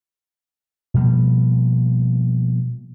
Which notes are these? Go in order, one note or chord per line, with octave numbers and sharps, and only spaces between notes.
B2 F3 G3 A#3